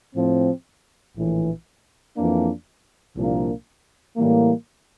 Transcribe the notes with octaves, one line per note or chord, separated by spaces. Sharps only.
A2 F3 C4
A#1 A2 E3
F2 E3 A#3 D4
C2 A#2 F3 A#3 D4
A2 E3 G3 A#3